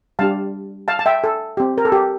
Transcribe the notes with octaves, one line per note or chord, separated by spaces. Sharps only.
G3 D4 G4 F5 A5
F5 A5
A5
E5 G5
A4
C4 G4
A#4
A4
G4